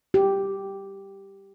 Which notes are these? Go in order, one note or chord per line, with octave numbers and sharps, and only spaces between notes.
G4